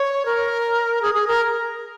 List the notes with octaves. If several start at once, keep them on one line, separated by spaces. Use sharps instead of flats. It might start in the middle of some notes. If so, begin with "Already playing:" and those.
Already playing: C#5
A#4
G#4
G#4
A#4